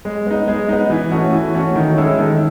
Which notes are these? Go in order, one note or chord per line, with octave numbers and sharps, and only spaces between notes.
G#3
B3 D#4
G#3
B3 D#4
E3
A3 C#4 F#4
E3
A3 C#4 F#4
D#3
G#3 C#4 E4 A4
D#3